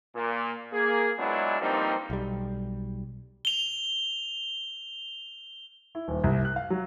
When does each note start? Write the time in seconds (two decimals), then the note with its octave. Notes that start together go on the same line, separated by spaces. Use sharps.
0.15 A#2
0.72 A#3 G#4
1.18 F#3 G#3 B3 D4 E4 F4
1.60 G2 F3 G3 A#3 C4 D#4
2.10 B1 G3
3.45 F7 G7
5.95 E4
6.08 D#1
6.24 C2
6.45 F#6
6.56 F5
6.70 F#3